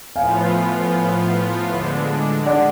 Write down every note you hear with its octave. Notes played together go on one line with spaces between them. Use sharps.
A2 F3 B3 F4 F5 G#5
D3 G#3 D4
D5 F#5